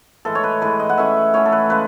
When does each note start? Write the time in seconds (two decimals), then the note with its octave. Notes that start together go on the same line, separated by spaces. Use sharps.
0.25 A2 E3 G#3 A4
0.35 C#5
0.44 B4
0.62 A2 E3 G#3 B4
0.80 D#5
0.89 F#5
0.98 E3 A3 C#4 E5
1.34 E3 A3 C#4 C#5
1.45 A4
1.52 B4
1.70 C#3 G#3 B4